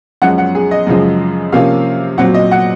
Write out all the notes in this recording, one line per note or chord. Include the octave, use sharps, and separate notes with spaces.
F#2 F3 G#3 C#4 F#5
F#5
G#4
D#5
F#2 C#3 F3 G#3
C3 F3 A#3 C#4 F5
A#2 F#3 C4 F#5
D#5
F#5